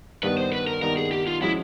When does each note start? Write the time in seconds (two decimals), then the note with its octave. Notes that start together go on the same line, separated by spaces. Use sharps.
0.23 G2 D#3 G3 B3 B4
0.37 C5
0.53 B4
0.67 A#4
0.82 G2 D#3 G3 B3 A#4
0.97 G#4
1.11 G4
1.27 F4
1.41 F3 G#3 C#4 E4 F#4